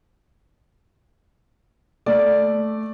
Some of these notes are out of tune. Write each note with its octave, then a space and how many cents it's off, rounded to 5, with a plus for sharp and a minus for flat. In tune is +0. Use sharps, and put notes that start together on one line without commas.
A3 -5 D5 +0